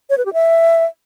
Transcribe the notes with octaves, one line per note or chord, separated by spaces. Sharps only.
C#5
B4
G4
E5